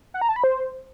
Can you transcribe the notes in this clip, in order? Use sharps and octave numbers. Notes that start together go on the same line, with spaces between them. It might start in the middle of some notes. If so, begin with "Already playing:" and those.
F#5
A#5
A5
B5
C5